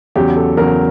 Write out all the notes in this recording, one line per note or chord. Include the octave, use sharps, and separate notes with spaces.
E2 C#3 F#3 G4
A4
E2 C#3 F#3 A#4